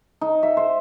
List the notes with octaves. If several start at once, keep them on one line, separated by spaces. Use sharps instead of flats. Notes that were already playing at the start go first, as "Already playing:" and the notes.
D#4
E5
C5